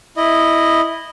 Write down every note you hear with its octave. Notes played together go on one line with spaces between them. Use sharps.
E4 D#5